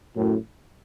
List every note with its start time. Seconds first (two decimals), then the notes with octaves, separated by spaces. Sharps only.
0.16 F#2 A2